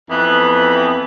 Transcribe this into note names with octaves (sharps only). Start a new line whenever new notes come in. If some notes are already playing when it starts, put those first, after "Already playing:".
F2 E3 B3